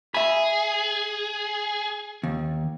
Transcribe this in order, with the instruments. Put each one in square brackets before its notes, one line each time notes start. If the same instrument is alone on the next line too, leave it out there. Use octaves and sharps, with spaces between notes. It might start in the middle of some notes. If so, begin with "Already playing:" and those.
[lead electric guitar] G#4 [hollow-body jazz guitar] E5 B5
[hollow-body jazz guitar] D#2